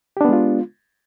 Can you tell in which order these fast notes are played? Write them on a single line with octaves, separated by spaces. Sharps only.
G4 D4 B3 G#3 F4